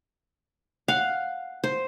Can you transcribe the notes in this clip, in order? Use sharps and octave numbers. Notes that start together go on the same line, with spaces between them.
F5 F#5
C5